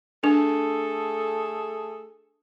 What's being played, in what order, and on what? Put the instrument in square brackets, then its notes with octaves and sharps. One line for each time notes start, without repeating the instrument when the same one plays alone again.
[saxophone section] A3 G#4 A4 [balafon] D4